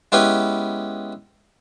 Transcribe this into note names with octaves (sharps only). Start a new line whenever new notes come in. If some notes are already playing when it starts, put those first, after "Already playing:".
G#3 B3 C#4 E4 G4 B4